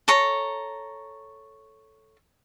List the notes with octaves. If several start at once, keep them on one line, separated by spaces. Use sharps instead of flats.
A4 C#5 A#5